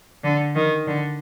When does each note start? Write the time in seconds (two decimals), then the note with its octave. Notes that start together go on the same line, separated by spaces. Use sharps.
0.24 D3
0.55 D#3
0.87 D3